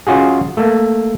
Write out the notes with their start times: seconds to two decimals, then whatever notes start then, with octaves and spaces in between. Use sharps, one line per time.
0.07 C#4 F4 F#4 G#4
0.57 A3 A#3